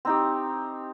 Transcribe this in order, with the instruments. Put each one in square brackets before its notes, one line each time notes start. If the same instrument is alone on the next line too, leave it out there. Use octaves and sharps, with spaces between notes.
[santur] C4 D#4 G4